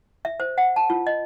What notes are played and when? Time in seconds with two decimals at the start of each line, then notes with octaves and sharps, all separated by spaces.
0.25 E5
0.40 C5
0.58 F#5
0.76 A5
0.90 F4
1.07 D#5